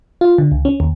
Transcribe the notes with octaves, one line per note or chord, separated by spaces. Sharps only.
F4
D3
C#2
C#4
D#2